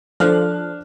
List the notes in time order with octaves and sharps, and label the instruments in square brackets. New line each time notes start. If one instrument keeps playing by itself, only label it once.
[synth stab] F3 [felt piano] D4 F6 F#6 [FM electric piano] A4